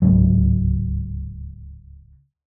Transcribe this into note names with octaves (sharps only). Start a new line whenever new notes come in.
D1 C#2 G#2 F#3